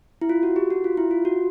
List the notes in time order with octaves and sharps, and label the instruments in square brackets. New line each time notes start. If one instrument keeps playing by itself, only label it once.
[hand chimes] E4
F4
F#4
G4
F#4
F4
E4
F4
F#4